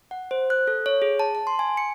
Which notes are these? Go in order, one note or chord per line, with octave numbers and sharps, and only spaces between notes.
F#5
C5
F#6
A4
C#5
G#4
A5
A5
C6
G#5
C#7